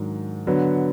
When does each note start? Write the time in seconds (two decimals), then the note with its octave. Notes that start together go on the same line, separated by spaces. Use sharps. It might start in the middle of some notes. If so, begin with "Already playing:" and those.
Already playing: G#2 D#3 F#3 D4
0.47 D3 F#3 B3